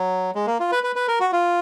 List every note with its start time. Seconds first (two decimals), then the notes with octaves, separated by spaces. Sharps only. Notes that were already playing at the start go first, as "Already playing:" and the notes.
Already playing: F#3
0.35 G#3
0.47 A#3
0.60 F4
0.72 B4
0.83 B4
0.96 B4
1.08 A#4
1.20 F#4
1.33 F4